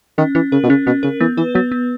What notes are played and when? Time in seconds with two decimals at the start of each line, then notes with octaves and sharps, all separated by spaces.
0.18 D#3 C#4
0.35 E3 C#4
0.52 C#3 A#4
0.63 B2
0.69 C#3 C#4
0.86 B2 C#4
1.03 C#3 A#4
1.20 E3 B3
1.37 E3 B4
1.55 F#3 B3
1.72 B3